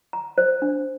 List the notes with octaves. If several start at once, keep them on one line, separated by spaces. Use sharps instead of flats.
A#5
C5
D4